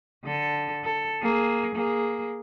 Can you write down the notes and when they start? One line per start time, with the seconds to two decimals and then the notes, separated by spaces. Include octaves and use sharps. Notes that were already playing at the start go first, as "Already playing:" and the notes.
0.25 D3 A4
0.84 A4
1.23 A#3 G#4
1.75 A#3 G#4